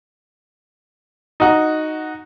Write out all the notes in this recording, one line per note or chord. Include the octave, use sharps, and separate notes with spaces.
D#4 F#4